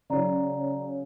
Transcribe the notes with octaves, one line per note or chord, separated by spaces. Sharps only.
C#3 F#3 D5 A#5